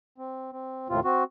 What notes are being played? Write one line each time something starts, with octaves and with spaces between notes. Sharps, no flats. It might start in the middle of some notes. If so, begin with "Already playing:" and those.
C4
C4
D#2 A2 C3 C4 F4
C4 F#4